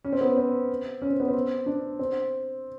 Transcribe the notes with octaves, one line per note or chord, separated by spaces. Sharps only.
C#4
C4
B3
C4
C#4
C4
B3
C4
D4
C4